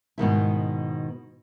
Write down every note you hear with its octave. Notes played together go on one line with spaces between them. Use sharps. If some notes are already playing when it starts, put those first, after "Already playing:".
G#2 B2 D#3 E4